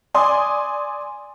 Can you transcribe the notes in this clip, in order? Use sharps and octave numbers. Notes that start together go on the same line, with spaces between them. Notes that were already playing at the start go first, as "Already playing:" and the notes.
D5 G#5 C6 D#6